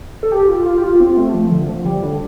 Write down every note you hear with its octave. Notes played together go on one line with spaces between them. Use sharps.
A4
G4
F4
F4
G4
F4
C4
A3
F3
D3
F3
G3
D3